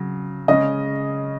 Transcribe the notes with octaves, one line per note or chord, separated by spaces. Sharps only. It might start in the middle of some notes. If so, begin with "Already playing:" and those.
Already playing: C#3 F#3
C#3 G#3 C#4 D#5